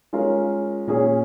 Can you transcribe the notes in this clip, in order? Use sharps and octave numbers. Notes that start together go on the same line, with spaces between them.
G#3 C#4 F4 A#4
A#2 A#3 C#4 G#4